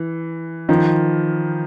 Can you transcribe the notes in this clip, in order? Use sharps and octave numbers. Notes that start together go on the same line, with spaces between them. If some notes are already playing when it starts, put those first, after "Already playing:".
Already playing: E3
D#3 F3